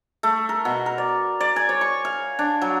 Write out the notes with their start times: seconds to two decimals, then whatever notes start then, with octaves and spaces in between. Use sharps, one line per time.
0.23 A3
0.49 A#4
0.65 B2
0.86 A#4
0.98 D5
1.40 D5
1.56 G#5
1.69 C#5
1.81 C#6
2.05 F5
2.39 D4
2.62 F#3